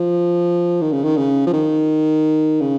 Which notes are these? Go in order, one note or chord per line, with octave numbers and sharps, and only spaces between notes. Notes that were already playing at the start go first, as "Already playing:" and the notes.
Already playing: F3
D#3
C#3
D#3
C#3
F3
D#3
C#3